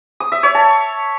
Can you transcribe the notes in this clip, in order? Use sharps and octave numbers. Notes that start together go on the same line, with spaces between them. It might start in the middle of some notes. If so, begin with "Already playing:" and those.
D#6
E5
C#5
A5